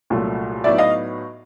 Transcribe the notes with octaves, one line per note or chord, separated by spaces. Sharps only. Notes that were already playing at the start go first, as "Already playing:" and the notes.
C2 A#2 F#3 A3
A2 F#3 B3 D#4 D5 E5
D#5 F5